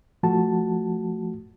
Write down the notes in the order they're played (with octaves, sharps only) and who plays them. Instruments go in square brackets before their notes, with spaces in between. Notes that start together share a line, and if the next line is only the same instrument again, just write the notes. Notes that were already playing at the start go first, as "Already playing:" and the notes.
[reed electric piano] F3 A3 F#4 A5